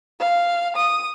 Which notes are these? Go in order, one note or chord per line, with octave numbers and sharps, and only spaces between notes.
F5
D#6